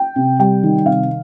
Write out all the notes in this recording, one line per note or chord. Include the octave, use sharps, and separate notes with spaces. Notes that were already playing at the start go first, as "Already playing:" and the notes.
Already playing: G5
C3
G3 G5
D#3
C3 F5